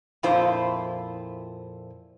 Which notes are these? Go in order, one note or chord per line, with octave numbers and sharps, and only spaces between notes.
F2 A#2 E4 F4 C5